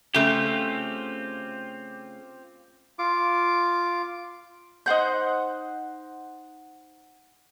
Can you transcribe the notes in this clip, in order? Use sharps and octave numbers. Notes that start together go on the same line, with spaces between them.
C#3 A3 C4 F4 G4
F4 D6
D#4 C5 F#5 G6